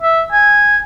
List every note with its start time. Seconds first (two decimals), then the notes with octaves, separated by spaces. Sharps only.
0.02 E5
0.32 G#5